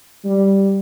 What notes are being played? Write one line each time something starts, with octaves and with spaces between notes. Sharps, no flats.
G3